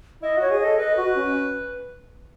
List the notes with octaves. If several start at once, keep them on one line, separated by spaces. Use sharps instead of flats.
E4 D#5
F#4 C#5
G#4
A4 D#5
B4 D#5
F#4
C#4